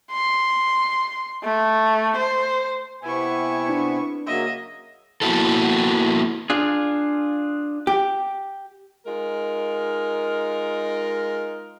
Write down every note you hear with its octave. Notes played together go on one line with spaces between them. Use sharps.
C6
A3
C5
C3 B3 E4 G#5 C#6
D4
C#3 F#3 A#3 D#5 E5
A#3 B3 E4 F#4 A4
D4 F4 G#4
G4
G#3 D#4 F4 A#4